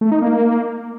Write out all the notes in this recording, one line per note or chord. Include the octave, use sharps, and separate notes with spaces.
A3
D#4
A#3